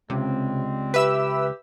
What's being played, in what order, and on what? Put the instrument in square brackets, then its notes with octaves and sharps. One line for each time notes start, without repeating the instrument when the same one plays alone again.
[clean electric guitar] C#2 [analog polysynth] C3 [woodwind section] G3 G#3 C4
[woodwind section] G4 [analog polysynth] B4 E5 E6